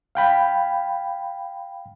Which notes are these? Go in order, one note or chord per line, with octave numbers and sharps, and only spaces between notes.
F5 G5 B5